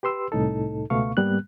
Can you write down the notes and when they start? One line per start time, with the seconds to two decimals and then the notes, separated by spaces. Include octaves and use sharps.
0.03 G4 B4 C6 E6
0.32 C2 A2 D#4 A4
0.90 C#2 B2 A3 B3 F5 C#6
1.17 G#2 G3 A#3 B3 F#6